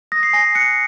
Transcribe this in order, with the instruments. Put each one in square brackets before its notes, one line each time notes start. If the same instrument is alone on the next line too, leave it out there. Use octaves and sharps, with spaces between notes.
[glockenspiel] D#6 A#6
C7
G#5 A#6
F#6 C#7